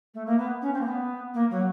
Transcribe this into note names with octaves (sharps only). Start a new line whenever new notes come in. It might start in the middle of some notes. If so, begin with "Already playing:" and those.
A3
A#3
B3
C#4
C4
A#3
B3
A#3
F#3